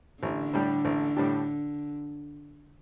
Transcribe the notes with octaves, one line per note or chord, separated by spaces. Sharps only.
A1 D3
A2 G3 D4 G4
A1
A2 G3 D4 G4